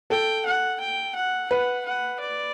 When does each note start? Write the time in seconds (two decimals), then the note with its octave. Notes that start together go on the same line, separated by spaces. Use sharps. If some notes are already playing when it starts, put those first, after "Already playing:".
0.10 A4 G5
0.46 F#5
0.80 G5
1.15 F#5
1.51 B4 F#5
1.86 F#5
2.20 D5